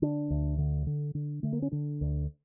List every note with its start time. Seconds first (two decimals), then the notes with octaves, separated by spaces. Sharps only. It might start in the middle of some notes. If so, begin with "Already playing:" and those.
0.02 D3 D4
0.30 D2
0.58 D3
0.87 D3
1.15 D3
1.43 D3 A3
1.53 A#3
1.62 C#4
1.72 D3 D4
2.01 D2